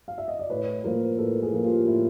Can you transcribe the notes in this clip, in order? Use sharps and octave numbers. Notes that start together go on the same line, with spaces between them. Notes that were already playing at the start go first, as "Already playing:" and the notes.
F5
E5
D#5
D5
A2 B4 C#5
F3 A#3 A#4 C5
A2 A4 B4
G#4 A#4
F3 A#3
F4 G4
A2 E4